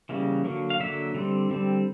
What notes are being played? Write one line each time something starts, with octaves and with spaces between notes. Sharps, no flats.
C#3 E3 G3 A#3
D3 F#3 A#3
F5
D3 F#3 A#3 E5
D3 G3 C4
D3 G3 C4